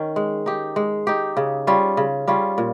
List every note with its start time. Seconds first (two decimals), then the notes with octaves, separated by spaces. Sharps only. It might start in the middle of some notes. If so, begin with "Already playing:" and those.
Already playing: D#3 C#4
0.16 G#3
0.46 D#4 G4
0.76 G#3
1.07 D#4 G4
1.37 C#3
1.67 G3 C#4 F4
1.97 C#3
2.28 G3 C#4 F4
2.58 A#2